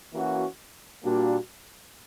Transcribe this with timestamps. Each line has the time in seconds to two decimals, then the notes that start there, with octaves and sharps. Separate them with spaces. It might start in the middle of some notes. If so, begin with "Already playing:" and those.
0.13 E3 A#3 C#4 F#4
1.04 A#2 G3 A#3 D4 F#4